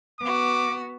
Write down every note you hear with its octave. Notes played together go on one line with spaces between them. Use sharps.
B3 F#4 D6